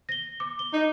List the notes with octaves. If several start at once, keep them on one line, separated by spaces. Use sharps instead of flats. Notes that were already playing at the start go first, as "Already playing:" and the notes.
A#6 G7
D6
G7
D#4